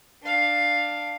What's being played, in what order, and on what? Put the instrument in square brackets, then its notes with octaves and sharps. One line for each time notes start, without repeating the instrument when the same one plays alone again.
[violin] D4 F5